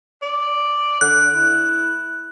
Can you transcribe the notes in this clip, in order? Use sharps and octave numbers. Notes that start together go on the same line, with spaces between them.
D5
D3 F#6
E4